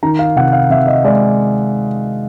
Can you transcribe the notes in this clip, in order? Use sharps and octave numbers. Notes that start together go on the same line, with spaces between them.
D#3 A#5
F5
C3 F#5
F5
C3 E5
D#5
G#3 D5